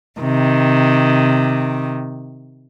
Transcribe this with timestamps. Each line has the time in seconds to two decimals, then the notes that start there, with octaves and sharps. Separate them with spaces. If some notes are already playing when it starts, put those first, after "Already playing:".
0.20 C3 D#3